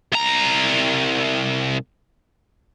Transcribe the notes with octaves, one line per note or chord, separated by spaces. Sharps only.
C2 A#5